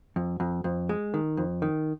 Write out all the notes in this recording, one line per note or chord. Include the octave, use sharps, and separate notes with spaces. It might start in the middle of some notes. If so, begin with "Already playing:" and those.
F2
F2
F2
G#3
D#3
F2
D#3